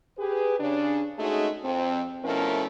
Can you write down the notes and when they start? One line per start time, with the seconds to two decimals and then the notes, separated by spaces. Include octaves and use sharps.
0.18 G4 G#4 B4
0.59 C#3 D4
1.18 G#3 A3 C#4 D#4 F#4 G#4
1.63 F2 C4
2.24 B2 F3 A3 C#4 E4 A#4